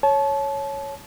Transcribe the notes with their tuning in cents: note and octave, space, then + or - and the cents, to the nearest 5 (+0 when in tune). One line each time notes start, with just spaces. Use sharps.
C#5 +0 A5 -30